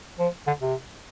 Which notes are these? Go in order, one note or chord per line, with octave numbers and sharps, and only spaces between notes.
F3
D3
C3